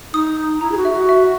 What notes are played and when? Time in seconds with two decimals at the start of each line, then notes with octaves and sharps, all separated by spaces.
0.13 D#4 D#6
0.37 D#6
0.61 E4 A#5
0.72 G#4
0.77 F#4
0.85 E5
0.93 F#4
1.09 E5